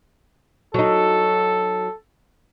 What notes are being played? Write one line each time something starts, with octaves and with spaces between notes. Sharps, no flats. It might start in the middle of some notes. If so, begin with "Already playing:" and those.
F#3 D#4 A4